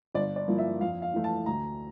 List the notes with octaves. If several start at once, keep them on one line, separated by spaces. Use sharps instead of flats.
G1 D5
D5
G2 F3 A#3 E4
E5
F2 F5
F5
E3 A3
A5
D2 A#5